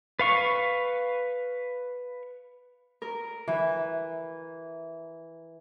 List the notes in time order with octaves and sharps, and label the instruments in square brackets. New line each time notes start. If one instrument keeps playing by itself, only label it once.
[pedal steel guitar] B4 F5 C#6
[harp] A#4
E3